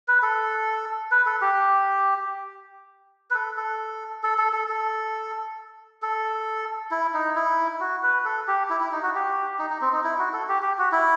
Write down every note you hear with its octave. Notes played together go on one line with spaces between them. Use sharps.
B4
A4
B4
A4
G4
B4
A4
A4
A4
A4
A4
A4
A4
E4
D#4
E4
F#4
B4
A4
G4
E4
E4
D#4
F#4
G4
D#4
D#4
C4
D#4
E4
F#4
A4
G4
G4
F#4
E4